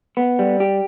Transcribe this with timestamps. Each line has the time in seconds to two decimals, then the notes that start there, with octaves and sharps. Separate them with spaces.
0.17 B3
0.39 G3
0.60 G4